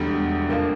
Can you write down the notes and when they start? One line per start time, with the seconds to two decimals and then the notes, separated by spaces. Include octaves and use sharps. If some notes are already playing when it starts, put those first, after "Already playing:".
Already playing: E1 E2 D3 G3
0.48 F2 D3 F3 A#3 F4